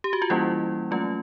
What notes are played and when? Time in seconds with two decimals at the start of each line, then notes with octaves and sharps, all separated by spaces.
0.04 G4
0.13 F#4
0.22 F4
0.30 E3 G3 A#3 C#4 E4
0.91 F#3 A3 C#4 F4